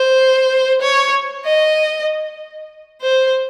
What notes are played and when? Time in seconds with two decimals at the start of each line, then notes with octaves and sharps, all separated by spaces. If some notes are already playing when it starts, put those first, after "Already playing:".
Already playing: C5
0.82 C#5
1.45 D#5
3.01 C5